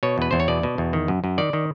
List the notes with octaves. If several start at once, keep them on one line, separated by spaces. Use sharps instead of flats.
B2 C#5
E2 B4
E2 C5
C#5
B2 D5
B2
E2
D#3
F#2
F#2
D#3 D5
D#3